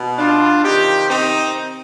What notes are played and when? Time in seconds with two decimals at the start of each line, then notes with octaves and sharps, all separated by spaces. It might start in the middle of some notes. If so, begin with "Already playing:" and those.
Already playing: B2
0.19 D4 F4
0.64 C3 D#3 D#4 G4
1.09 C4 D#4